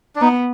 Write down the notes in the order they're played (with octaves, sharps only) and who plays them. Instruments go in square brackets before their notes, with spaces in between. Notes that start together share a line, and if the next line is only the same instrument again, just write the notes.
[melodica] D4
[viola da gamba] B3 [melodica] D#4